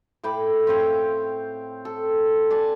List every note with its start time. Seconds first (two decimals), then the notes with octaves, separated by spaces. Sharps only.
0.23 A2 G5 B5 D6
0.67 C4 C#5 F5 G5
1.85 A4
2.50 D5 G#5 A5 D6